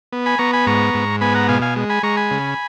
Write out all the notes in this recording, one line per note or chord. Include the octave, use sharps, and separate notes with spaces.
B3
G#5 B5
B3 A#5 C#6
G#5 B5
G#2 A#5 C#6
G#2
B3 G#5 B5
F#5 A#5
B2 F5 G#5
F5 G#5
G#3
G#5 B5
G#3 A#5 C#6
G#5 B5
C#3